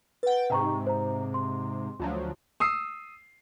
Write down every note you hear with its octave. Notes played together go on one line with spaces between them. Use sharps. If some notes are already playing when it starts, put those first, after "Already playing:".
B4 F#5 G5 A6
G#2 C3 G5 A#5 C#6
C5 A#5
C6
D2 F3 F#3
D#6 E6 C7